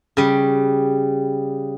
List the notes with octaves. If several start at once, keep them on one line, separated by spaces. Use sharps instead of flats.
C#3 G3